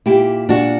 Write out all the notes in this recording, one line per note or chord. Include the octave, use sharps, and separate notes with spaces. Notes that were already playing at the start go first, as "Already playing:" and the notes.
A#2 E4 G4
A#2 D4 F#4